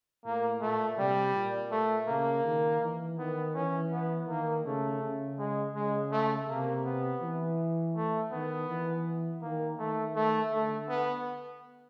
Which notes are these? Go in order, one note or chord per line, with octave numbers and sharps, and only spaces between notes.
A2 A#3
A#2 A3
C3 G3
A#2
A3
C#3 A#3
D#3
E3
D#3 B3
E3 C#4
B3
D#3 A#3
C#3 A3
C#3
G#3
C#3 G#3
A3
C3 A#3
B3
E3
A3
D#3 B3
E3
D#3 A#3
D#3 A3
A3
D3 A3
B3